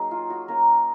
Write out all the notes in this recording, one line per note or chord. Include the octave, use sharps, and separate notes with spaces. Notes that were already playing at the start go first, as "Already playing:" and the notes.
Already playing: F#3 A#3 D#4 G#4
F4
F#4
A#3 C#4 F4 A#4